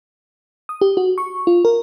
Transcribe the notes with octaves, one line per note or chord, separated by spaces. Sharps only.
D#6
G4
F#4
C#6
F4
A#4